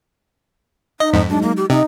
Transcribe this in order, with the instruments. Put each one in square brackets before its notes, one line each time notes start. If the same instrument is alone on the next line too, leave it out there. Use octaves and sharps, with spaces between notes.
[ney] D#4 [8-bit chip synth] D#5
[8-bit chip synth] F2 G#2 [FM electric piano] B6
[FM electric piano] F#3 G#3 D#4 [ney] D4
[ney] A#3
G4
[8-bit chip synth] C3 [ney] D#4 [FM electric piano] D#5